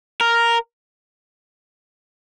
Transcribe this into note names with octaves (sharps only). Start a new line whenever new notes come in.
A#4